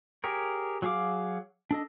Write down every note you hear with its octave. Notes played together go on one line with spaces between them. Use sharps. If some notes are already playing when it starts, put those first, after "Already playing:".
G4 G#4 A#4 C#5
F#3 F#4 G#4 F5 D6
D4 A4 D#5